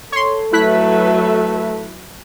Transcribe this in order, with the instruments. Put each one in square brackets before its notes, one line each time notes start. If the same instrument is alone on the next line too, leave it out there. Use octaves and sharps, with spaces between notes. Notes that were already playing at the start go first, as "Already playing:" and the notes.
[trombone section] A4 [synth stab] C#5 C6
[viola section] F#3 B4 E5 [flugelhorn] A3 [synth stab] E4 F#6 B6